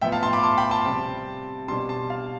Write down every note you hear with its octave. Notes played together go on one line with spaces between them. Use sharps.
A2 F3 B3 E5 G5
F5 A5
A5 C6
B5 D6
A5 C6
G5 B5
A5 C6
C3 G3 C4
B2 G3 D4 A5 C6
A5 C6
F5 A5